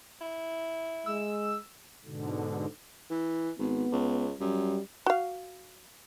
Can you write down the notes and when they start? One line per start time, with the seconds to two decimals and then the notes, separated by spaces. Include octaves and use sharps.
0.21 E4
1.06 G#3 E6
2.05 G#2 B2 D3
3.10 E3
3.59 G#1 B3
3.92 C#2
4.40 F#2 G3
5.06 F#4 F5